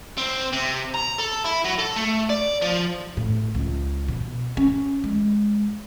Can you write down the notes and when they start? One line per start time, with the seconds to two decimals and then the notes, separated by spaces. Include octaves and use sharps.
0.17 C4
0.52 C3
0.94 A#5
1.19 A4
1.46 E4
1.65 F#3
1.79 A4
1.96 A3
2.29 D5
2.62 F3
3.17 A2
3.55 C#2
4.08 B2
4.57 C#4
5.04 G#3